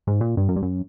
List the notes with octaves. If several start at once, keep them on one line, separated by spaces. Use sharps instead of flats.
G#2
A#2
G2
F#2
G2
F#2